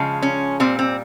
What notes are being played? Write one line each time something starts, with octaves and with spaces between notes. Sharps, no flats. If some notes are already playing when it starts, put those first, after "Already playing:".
Already playing: C#3 F3 G#3
C#4
A#2 G3 C4
C4